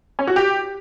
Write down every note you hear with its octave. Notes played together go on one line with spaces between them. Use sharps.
C#4
F#4
G4